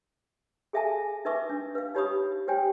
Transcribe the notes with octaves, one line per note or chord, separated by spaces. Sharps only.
G#4 A4 E5 F5 G#5 A5
D#4 A#4 B4 E5 C#6 D6
D4
B4 F5
D#4 G4 C#5 B5 C#6 D#6
G4 C5 C#5 G5 G#5